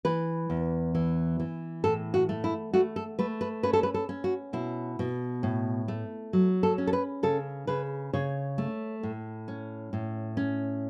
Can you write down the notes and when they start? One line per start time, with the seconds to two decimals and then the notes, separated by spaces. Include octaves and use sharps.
0.05 E3 B4
0.50 E2
0.95 E3
1.40 E3
1.84 A2 A4
2.14 F#4
2.29 A3
2.44 E4
2.74 A3 F#4
2.96 A4
3.19 A3 B4
3.41 B4
3.63 C#4 B4
3.73 A4
3.83 B4
3.94 A4
4.09 C#4
4.24 F#4
4.53 B2 E4
4.99 B2
5.43 A2
5.88 A3
6.33 F#3
6.63 A4
6.78 C#4
6.87 A4
6.93 B4
7.23 C#3 A4
7.67 C#3 B4
8.13 C#3 C#5
8.58 A3
9.03 A2
9.48 C#4
9.93 A2
10.37 C#4